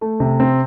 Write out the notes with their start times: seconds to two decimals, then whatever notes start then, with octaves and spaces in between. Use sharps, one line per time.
0.01 A3
0.20 C3
0.40 C4